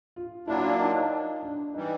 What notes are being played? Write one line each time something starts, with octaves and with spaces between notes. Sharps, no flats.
F4
A#2 F#3 A#3 D4 E4
D#4
D4
E3 G3 D#4